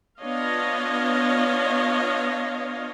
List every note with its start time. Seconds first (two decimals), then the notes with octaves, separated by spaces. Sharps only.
0.21 B3 D4 F4 C#5 D#5 F5